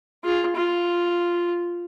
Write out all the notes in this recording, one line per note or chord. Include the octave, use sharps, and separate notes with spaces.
F4 G#4
F4